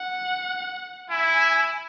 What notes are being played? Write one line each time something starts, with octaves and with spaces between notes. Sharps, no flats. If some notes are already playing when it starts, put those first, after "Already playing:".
Already playing: F#5
E4 G#5